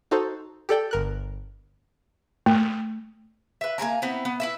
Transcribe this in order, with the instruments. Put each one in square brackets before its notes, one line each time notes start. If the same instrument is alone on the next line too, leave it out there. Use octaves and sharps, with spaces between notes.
[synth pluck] D#4 F#4 A4 C5
G4 A4 D5 G5
G1 A#4 F#6
[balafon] A3
[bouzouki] B4 E5
A#3 E4 G#5 A#5
B3 C4 E4
B3
E4 B4 E5